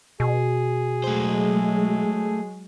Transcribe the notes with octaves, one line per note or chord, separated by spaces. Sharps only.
B2 G#4
F#3 G#3 A3 C5